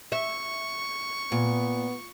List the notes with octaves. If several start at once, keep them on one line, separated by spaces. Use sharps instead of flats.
E5 C#6
A#2 B3